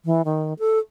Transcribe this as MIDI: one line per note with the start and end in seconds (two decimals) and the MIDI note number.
0.05 0.22 52
0.25 0.53 51
0.59 0.78 69